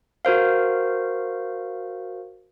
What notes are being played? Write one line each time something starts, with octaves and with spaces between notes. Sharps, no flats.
F#4 A#4 C5 F5